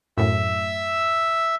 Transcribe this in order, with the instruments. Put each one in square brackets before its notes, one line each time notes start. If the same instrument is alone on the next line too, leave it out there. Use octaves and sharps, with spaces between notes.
[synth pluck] F#2 A2 [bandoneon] E5 E6